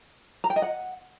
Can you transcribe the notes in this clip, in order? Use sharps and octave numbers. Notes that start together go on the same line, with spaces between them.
A#5
G5
D#5
F#5